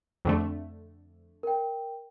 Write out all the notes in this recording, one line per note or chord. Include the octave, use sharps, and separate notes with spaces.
F2 D3 A3
A#4 G5